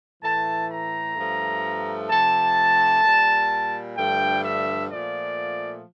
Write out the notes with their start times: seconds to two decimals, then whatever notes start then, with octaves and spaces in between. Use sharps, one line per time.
0.22 A2 E3 A3 A5
0.70 A#5
1.16 G2 F3 A3
2.10 C3 F3 A3 A5
3.03 A#2 G3
3.96 G2 D3 F3 A3 G5
4.43 E5
4.89 A#2 F3 A3 D5